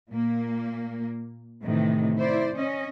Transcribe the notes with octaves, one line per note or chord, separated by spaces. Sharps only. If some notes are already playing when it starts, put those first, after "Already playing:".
A#2 A#3
A2 C3 D#3 E3
E4 C5 D5
C#4 D#5